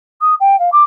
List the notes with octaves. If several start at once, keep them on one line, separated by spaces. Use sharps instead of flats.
D#6
G5
F5
D6